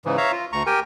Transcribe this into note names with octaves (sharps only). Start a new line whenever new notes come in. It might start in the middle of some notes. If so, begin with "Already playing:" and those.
G#2 C#3 E3
C#5 E5 F5 A#5
F4
D2 A#5 C#6
G4 A#4 G5 G#5